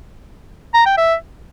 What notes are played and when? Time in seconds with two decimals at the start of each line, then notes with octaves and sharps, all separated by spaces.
0.74 A#5
0.86 G5
0.98 E5